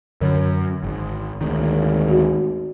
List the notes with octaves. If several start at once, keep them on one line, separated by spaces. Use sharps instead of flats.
F#2 D3 C#5
G#1
G#1 D2 D#3
F#4